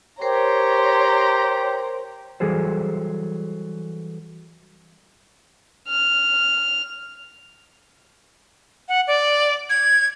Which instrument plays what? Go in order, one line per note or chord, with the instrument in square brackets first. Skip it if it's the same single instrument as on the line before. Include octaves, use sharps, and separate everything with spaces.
[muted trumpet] G4 [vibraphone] A#4 C5 G5 [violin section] C#5 [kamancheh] A#5 C6
[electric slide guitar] E3 F#3 G3 G#4 A4 C5
[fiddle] F6
[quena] F#5
D5
G#6